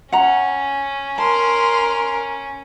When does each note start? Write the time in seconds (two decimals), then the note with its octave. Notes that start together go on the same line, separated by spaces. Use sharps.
0.12 C#4 F#5 A#5
1.18 A#4 A5 C6